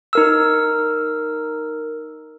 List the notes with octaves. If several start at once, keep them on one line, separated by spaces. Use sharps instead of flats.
D#4 A#4 E6